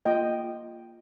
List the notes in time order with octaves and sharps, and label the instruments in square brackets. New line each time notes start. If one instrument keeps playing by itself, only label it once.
[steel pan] A#3 F4 D#5 G5